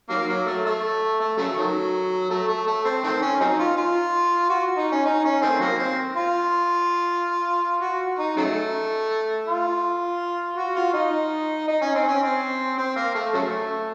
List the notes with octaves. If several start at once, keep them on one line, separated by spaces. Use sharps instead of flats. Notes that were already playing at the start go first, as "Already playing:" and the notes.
D#3 F#3 A#3
F#3
A3
A3
A3
C#3 F#3 A3
D#3 F#3
A3
A3
A3
C4
D#3 A3 C4
C#4
F#3 C4 D#4
F4
F4
F#4
D#4
C#4
D#4
C#4
D#3 A3 C4
D#3 F#3 A#3
C4
F4
F#4
D#4
C#3 F#3 A3
F4
F#4
F4
D#4
D#4
C#4
C4
C#4
C4
C4
A#3
A3
C#3 F#3 A3